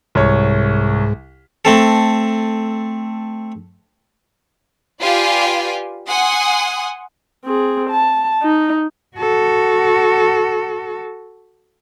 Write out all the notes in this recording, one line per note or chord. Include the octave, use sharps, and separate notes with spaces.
C2 G#2 C#5
A3 C4 A4
F4 G4 B4 D5 F5 G#5
F#5 G#5 C6 D#6
C4 G#4
A5
D#4
F#4 A4